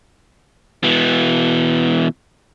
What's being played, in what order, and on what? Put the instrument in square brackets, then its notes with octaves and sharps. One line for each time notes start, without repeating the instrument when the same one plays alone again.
[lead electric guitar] B2 E3